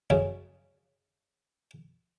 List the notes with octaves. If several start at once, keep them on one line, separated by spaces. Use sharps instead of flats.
F#2 C#3